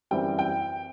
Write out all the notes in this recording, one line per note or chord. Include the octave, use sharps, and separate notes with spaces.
F#2 E3 G3 C4 G5
G5